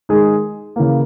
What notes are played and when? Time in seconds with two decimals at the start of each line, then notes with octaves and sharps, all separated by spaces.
0.09 D#3 G#3 D#4 G#4
0.76 C#3 E3 A#3